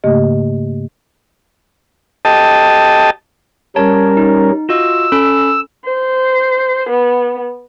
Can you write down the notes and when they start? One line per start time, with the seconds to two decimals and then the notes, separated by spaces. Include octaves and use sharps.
0.04 G#2 C#3 A3 A#3 G4 D#5
2.25 G4 A4 D#5 A5
3.76 G3 C#4 A#4 C#5 A5
4.17 D#4
4.69 F4 F#4 D#5 E6
5.12 C#4 A4 B5
5.85 C5
6.89 B3